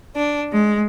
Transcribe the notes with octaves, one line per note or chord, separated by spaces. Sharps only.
D4
G#3